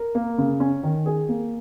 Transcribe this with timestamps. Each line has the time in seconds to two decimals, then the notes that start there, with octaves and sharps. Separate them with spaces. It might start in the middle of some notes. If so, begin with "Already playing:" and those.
Already playing: A#4
0.15 A#3
0.38 C#3
0.60 C#4
0.83 D#3
1.06 G#4
1.29 A#3